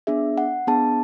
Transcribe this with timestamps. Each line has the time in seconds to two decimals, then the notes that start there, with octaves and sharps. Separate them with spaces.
0.07 B3 D4 G#4 E5
0.38 F#5
0.67 B3 D4 G#4 A5